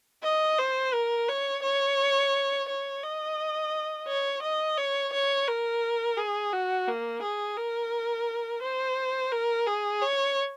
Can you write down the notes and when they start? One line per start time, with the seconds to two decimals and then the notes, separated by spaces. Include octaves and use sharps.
0.23 D#5
0.59 C5
0.94 A#4
1.29 C#5
1.63 C#5
2.69 C#5
3.03 D#5
4.08 C#5
4.42 D#5
4.78 C#5
5.13 C#5
5.48 A#4
6.17 G#4
6.53 F#4
6.88 A#3
7.22 G#4
7.57 A#4
8.62 C5
9.32 A#4
9.67 G#4
10.02 C#5